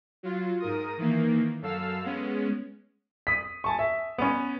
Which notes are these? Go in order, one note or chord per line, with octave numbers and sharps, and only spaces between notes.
F#3 F4
G#2 A#4 D#6
D#3 E3 A#3
F#2 A4 F5 E6 F6
G#3 B3 C#4
D#6 B6
G#5 A5 C#6
E5
B3 C#4